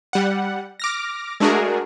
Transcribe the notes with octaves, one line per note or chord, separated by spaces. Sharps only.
G3 F#5
D6 F6 A#6
G#3 A3 D4 F#4 G#4 A#4